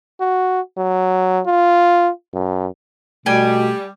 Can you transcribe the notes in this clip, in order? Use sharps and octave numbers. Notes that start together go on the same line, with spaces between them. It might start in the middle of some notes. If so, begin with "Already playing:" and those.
F#4
F#3
F4
F#2
B2 G3 A3 G5 G#5